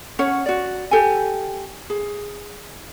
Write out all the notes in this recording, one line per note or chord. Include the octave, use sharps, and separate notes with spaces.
C#4 C#5 F#5
F#4 D5
G4 A4 G5 G#5
G#4